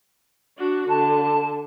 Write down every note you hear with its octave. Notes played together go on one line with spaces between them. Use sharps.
D4 F#4
D3 A5